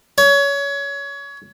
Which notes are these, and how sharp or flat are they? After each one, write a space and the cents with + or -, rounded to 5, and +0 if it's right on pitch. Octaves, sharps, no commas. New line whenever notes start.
C#5 +25